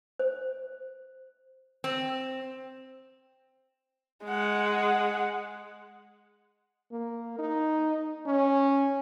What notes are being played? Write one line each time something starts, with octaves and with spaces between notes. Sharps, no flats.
C5
C4
G#3 F#5
A#3
D#4
C#4